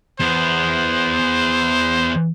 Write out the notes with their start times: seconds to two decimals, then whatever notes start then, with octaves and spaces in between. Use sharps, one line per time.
0.20 E2 B3 C5